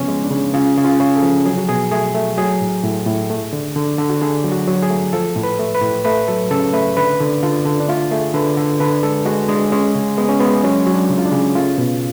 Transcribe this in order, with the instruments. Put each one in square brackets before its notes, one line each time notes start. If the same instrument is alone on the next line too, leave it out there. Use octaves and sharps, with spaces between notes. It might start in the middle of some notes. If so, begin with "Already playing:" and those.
Already playing: [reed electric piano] C#3 F3 B3 C#4
G#3
D4
C#3
C#3 F4
C#3
F4
C#3
A4
F3
F#3 G#4
F#4
B2 G#4
A3 G#4
A3
F#3 G#4
A2
A2
A2
A3
D3
D3
D3
F#4
D3 G#4
F#3
F#4
F#3
G#4
A3
F3 A4
A2
B4
A3
B4
A2
A3 B4
F#3 A4
C#3 A4
A3 B4
D3 B4
D3
D3 F4
D3
D4
A3 F4
A3 G#4
D3 B4
D3
D3 B4
G#3 A4
G#3 F#4
G#3 D4
G#3 C#4
C#3
G#3 B3
C#4
G#3 B3
F#3 C#4
F#3
D4
C#3
F4
D4
C#3
A3 F4
B2